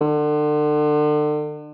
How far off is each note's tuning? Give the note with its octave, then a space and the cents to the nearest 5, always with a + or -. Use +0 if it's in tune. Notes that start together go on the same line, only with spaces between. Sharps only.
D3 +35